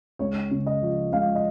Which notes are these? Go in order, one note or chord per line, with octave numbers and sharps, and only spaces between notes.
C#2 C#5
C#3
D#5
F3
C#2 F5
D#5